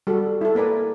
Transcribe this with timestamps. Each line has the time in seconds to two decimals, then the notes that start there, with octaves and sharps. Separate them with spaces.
0.07 G3 F#4 A4
0.41 E4 A4
0.55 A#3 A#4 B4 D5 G#5